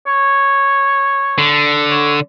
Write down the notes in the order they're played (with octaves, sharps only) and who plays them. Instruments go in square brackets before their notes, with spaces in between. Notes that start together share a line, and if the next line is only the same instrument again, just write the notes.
[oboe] C#5
[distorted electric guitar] D3
[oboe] C#5